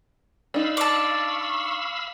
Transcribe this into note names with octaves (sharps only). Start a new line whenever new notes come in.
D4 D#4 F5 B5 E6
D5 A5 C#6